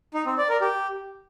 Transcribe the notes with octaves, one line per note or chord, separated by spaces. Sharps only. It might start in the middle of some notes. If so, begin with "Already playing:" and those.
D#4
C4
D5
A#4
G4